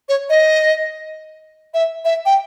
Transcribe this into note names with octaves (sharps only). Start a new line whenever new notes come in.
C#5
D#5
E5
E5
G5